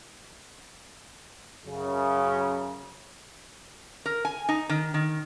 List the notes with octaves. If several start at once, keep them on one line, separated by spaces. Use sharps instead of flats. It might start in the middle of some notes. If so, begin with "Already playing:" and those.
F#2 C#3
A#4
G#5
D#4
D#3
D#3